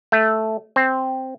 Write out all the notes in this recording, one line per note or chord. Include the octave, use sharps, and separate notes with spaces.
A3
C4